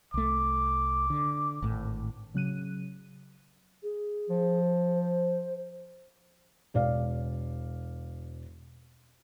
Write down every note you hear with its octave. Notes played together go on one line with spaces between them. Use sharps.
C2 A3 D6
D3
G#1 A2
C#3 F#3 F#6 D#7
G#4
F3
C5
E1 D5 F5